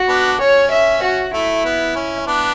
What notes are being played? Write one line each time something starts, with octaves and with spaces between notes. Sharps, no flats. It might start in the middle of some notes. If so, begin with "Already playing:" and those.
Already playing: F#4
B3 D4
C#4 C#5
E5
F#4
A3 E4
B3
C#4
B3 D4